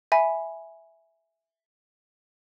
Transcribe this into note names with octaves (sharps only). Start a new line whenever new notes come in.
E5 G#5 B5